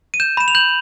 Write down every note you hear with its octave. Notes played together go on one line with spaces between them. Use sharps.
D#7
G6 E7
B5 E7
F7
G6 F#7